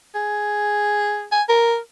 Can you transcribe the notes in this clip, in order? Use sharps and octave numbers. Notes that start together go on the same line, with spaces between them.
G#4
G#5
A#4